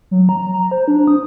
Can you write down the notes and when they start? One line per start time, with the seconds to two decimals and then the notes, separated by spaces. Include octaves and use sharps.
0.11 F#3
0.29 A#5
0.53 A#5
0.71 C5
0.88 D4
1.08 D#6